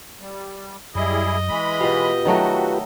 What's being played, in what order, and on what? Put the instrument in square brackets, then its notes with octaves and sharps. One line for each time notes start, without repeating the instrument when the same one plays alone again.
[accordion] G3
[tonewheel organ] F#2 [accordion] G3 E4 G#4 [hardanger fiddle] D#5
[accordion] E3 G#3 B5
[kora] B2 F5 [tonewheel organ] F4 G4 B4
[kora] D#3 F#3 A3 [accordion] F#4